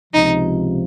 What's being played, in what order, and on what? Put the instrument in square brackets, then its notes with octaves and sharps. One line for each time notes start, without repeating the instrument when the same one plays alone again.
[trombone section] C#2 C3 F3 [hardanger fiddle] D#4